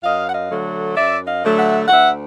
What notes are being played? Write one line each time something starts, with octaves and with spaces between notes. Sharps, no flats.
F#2 D#5 F5
F#5
D#5 F5
D3 F#3 A3
F#2 D5 E5
D#5 F5
D3 F#3 A3
E5 F#5
D2 E5 F#5